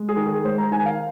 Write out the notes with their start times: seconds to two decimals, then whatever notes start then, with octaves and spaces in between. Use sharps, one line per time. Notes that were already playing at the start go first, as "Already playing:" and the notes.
Already playing: G#3
0.09 G#4
0.17 D#3
0.26 G#4
0.44 G#3 C5
0.58 A#5
0.71 D#3 G#5
0.86 F5